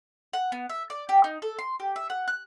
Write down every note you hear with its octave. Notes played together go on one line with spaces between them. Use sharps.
F#5
B3
E5
D5
G4
D#4
A4
C6
G4
E5
F#5
F#6